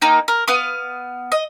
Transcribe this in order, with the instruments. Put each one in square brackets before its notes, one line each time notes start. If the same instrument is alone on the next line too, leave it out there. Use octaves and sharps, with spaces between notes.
[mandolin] A#3 D#4 G5
A#4
B3 F5 D#6
D#5